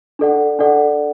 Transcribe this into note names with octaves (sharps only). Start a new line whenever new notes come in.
D4 A4 D5 F#5
D4 A4 D5 F#5